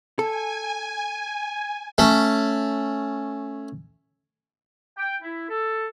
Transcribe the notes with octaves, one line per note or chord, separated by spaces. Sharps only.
A4 G#5
A3 C#4
G5
E4
A4